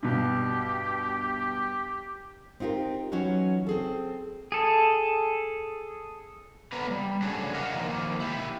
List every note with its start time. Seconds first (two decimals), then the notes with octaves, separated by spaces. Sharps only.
0.03 G2 B2 G4
2.60 C4 D#4 F4 G4 A#4
3.12 E3 F#3 C#4 D#4 F4 F#4
3.67 C4 G#4 A4
4.52 G#4 A4
6.72 D3 B3 B4 A#5
6.87 G3 A#3
7.22 C#3 F#3 A3 D4 G#4
7.54 A#4 D#5 F5 F#5
7.75 D#3 F3 A#3 F4
8.20 E4 G4